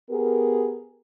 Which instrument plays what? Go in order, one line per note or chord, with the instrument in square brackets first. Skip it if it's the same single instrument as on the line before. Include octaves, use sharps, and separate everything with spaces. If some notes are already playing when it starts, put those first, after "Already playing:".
[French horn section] B3 G4 G#4 A#4